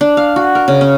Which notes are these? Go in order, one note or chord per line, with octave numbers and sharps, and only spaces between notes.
D4
F5
F#4
A#4
C#3
C#4